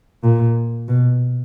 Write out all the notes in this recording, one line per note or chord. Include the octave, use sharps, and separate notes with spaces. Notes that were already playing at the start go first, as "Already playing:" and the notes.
A#2
B2